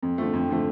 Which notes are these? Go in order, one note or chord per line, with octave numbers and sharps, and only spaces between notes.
F2
D3 F3 A3
F2
D3 F3 A3